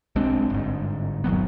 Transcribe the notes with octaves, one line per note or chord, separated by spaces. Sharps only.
B1 G#3 C4 D4
G1 G#2
D#1 D#3 F#3 B3